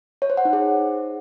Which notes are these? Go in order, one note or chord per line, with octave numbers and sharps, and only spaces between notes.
C#5
C5
F#5
D#4
G#4